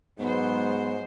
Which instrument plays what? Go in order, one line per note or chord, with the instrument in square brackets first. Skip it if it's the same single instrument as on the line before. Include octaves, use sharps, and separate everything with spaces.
[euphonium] G#2 [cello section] F#3 G#3 C5 [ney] B3